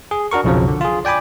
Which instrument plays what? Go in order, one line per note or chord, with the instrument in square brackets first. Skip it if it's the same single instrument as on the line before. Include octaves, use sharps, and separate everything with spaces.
[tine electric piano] G#4
D4 F#4 A#4 C#6
B1 F2 C#3 F3 F#3
D3
F4 G#4
D5 G5 G#5 B5 D6